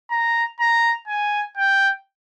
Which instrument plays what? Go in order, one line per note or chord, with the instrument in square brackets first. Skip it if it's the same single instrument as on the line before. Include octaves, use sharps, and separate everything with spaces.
[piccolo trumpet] A#5
A#5
G#5
G5